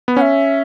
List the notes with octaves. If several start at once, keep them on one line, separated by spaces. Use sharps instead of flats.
B3
C#4 E5 F#5